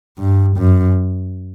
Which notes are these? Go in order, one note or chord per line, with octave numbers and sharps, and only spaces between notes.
G2
F#2